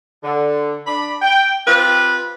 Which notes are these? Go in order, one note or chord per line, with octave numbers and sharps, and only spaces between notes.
D3
D4 B5
G5
C4 F4 G4 B4